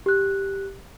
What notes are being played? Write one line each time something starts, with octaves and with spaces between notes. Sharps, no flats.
G4 F#6